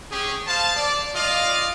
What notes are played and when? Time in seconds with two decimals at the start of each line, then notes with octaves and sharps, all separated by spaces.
0.11 C#4 G4 G#4
0.47 C5 F5 A5
0.76 D5
1.15 F4 D5 D#5 F5